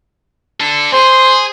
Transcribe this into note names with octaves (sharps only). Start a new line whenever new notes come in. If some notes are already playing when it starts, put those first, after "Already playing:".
D4 A4
G#4 C5